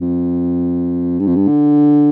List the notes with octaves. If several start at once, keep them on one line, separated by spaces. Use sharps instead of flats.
F2
G2
F2
G2
D3